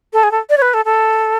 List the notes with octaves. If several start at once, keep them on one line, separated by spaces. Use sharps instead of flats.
A4
G#4
A4
D5
C#5
B4
A4
A4